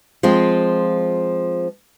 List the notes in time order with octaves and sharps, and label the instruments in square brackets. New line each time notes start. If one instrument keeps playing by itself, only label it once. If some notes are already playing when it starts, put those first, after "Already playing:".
[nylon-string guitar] F3 G#3 C4 F4